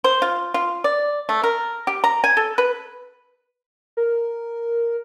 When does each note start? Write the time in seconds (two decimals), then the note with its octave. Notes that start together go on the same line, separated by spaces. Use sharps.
0.04 C5
0.22 F4
0.54 F4
0.84 D5
1.29 A3
1.44 A#4
1.87 G4
2.04 A#5
2.24 G#5
2.37 A4
2.58 B4
3.97 A#4